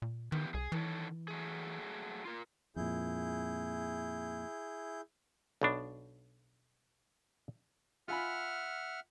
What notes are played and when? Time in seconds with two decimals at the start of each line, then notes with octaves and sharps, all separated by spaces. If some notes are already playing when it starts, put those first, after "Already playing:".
0.02 A#2
0.32 D#3 E3 B3 G4
0.54 C2 G#4
0.72 D#3 E3 A4 C#5
1.28 F#3 A3 G#4
2.25 F4 A#4
2.76 F2 A#2 E4 G#4 G6
5.62 B1 B2 D4
8.08 F4 E5 F#5 G#5 B5 F6